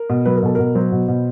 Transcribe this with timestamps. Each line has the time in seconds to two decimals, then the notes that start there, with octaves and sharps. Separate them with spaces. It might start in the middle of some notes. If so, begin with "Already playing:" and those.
Already playing: A#4
0.09 B2
0.25 F#3 B4
0.36 A#4
0.43 B2 A4
0.55 B2 A#4
0.75 F#3 C5
0.92 B2
1.08 B2